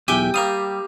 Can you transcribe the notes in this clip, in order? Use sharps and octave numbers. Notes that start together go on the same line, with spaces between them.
B1 E2 G4 E5 G5 G#5
G3 A#3 F5 D#6